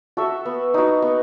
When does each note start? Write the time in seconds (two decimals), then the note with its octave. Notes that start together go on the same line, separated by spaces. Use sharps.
0.17 F#4 A4 E5
0.45 B3
0.74 D#4 F#4
1.02 B3